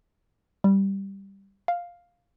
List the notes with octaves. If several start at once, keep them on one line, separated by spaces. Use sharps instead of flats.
G3
F5